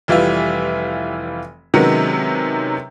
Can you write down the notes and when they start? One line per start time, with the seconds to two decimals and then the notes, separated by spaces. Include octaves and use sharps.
0.08 F1 E3 G3 F4 E5
1.74 C3 D#3 F#3 G#3 B3 C#4